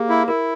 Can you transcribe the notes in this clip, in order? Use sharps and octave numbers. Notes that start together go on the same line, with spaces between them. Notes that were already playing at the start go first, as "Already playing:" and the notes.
Already playing: A#3 G4 G#4
E4
E4 A#4